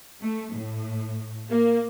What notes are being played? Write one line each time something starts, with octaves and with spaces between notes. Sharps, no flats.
A3
A2
A#3